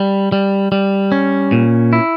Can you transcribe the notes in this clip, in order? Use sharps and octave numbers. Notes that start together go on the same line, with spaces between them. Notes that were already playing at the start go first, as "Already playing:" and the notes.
Already playing: G3
G3
G3
C#4
A#2
E4